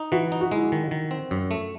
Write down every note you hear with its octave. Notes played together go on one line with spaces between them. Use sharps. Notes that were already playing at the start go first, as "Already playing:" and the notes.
Already playing: D#4
E3 F#4
D#4
F#4
G#3 E4
D#3
D#3
C4
F#2
A3